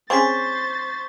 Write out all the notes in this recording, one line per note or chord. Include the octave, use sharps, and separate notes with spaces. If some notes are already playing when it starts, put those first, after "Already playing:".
C4 C#4 G#4 C5 C#6 D6 A6 B6